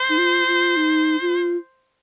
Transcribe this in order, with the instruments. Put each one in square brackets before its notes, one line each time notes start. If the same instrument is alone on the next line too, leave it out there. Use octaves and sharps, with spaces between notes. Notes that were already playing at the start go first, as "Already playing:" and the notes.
Already playing: [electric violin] C5
[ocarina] D#4
F4
F4
D#4
F4